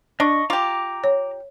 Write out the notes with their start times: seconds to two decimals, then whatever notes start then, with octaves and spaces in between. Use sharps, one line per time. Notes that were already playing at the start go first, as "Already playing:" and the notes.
0.20 D4 D#5 C#6
0.50 F4 G4 A#5 D6
1.04 C#5